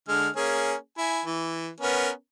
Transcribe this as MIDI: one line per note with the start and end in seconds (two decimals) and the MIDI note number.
0.09 0.28 50
0.09 0.28 56
0.09 0.28 89
0.36 0.74 58
0.36 0.74 61
0.36 0.74 68
0.98 1.23 64
0.98 1.23 80
1.25 1.70 52
1.80 2.10 59
1.80 2.10 61
1.80 2.10 70